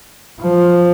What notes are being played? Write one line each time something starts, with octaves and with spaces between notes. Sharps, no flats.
F3